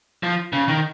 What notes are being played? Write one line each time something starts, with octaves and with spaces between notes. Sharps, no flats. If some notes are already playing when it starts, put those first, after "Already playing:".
F3
C#3
D#3